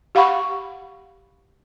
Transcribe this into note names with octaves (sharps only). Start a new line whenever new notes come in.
G4 F5 F#5 B5 C#6